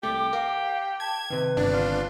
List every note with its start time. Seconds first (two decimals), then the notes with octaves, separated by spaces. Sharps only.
0.03 C2 A3 G4 D6
0.33 A#4 F5
1.00 A5 G#6
1.30 C3 D#3 B4
1.57 G1 D4
1.74 F4